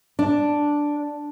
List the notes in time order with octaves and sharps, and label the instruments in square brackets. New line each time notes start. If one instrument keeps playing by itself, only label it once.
[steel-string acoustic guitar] D4